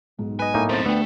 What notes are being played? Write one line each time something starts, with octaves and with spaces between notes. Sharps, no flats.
B1 G#2
B4 D#5 G#5
A2 A#3 D#4
C4 A4 C5 D#5 A6
D2 A3 B3 D5 G5